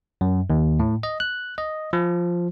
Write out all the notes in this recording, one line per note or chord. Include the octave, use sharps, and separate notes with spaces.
F#2
D#2
A2
D#5
F#6
D#5
F3